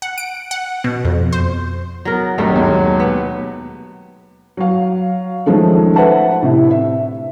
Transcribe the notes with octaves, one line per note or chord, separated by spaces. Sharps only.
F#5
D7
F#5
B2
F2
C5
F#3 B3 A#4
G#1 G2 F#3 A3 D#4 G4
D#2 B2 G#3
B3
F#3 F5
D#3 F3 G#3 A3 C#4
B4 C5 E5 F#5 A5
A2 C3
E5